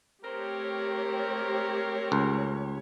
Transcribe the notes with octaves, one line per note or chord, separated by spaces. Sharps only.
A3 C4 G4 A#4 C#5
C#2